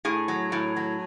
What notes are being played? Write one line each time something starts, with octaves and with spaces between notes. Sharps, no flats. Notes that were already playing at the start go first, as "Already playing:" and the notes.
A2 G#4
F#3
A2
F#3